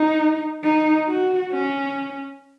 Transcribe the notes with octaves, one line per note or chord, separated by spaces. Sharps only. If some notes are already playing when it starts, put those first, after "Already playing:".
Already playing: D#4
D#4
F#4
C#4